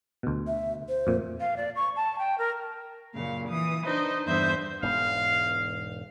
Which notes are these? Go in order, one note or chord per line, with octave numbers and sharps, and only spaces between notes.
D2 B2
E5
C5
F2 A#2
F5
D5
C#6
A5
G5
A#4
F#2 A#2 C#3 F5
E3 D#6
D4 D#4 B4 C5 D#5
E2 G2 D3 C5 E5 G6
E1 G#2 B3 F5